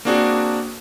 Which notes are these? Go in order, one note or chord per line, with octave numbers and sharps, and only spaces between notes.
A#3 C4 D4 F#4 G#4